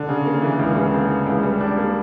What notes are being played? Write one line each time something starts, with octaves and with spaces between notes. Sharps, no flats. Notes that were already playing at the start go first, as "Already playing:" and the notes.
Already playing: D3
C#3
A#3
E3
C#2
C#3
A#3
E3
C#2
G3
D4
A#3